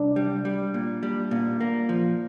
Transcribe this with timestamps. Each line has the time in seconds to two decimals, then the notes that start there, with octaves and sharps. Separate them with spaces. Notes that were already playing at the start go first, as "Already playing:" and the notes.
Already playing: C2 D4
0.16 G3
0.45 G3
0.74 A#2
1.03 G3
1.31 A#2
1.60 A#3
1.89 F3